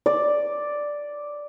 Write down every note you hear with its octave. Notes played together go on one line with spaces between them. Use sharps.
D5